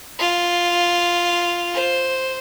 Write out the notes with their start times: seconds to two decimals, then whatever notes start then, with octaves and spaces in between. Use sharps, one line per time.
0.19 F4
1.74 C5